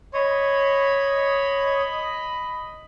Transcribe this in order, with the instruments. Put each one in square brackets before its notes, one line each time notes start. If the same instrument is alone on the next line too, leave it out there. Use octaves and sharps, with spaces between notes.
[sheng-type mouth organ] C#5 [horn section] D#5 B5